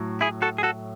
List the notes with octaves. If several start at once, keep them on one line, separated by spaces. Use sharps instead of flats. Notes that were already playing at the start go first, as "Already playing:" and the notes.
Already playing: A2 F#3
E4 G#4
F#4 A4
G#4
F#4 A4